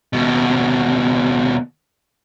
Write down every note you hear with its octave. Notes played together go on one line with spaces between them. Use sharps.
D#2 B2